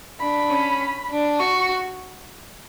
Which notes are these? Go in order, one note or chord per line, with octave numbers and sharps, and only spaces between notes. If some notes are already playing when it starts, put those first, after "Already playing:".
D4 B5
C#4
D4
F#4 C#6